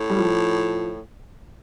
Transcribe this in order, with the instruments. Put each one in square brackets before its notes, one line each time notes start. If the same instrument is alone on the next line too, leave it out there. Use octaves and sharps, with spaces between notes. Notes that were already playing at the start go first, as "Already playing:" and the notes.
Already playing: [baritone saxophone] A2
[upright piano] G3
F3